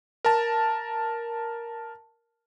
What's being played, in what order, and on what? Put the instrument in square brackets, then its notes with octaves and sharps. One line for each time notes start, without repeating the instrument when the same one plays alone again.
[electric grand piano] A#4 A5